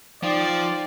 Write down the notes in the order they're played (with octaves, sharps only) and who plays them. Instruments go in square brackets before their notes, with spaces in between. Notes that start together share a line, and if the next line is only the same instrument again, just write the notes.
[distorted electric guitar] F3 [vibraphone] D#4 G5 [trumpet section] D5